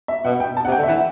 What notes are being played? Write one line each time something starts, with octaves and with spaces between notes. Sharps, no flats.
E5
B2 F#5
G5
A5
C3 F#5
G5
D3
E5
E3 F#5